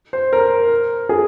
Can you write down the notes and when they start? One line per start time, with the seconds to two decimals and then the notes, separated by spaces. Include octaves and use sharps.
0.13 C5
0.33 A#4
1.09 G#4